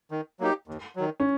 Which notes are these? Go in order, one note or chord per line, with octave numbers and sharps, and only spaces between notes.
D#3
F#3 A#3 D#4 G4
D#2
D#3 F#3
C#4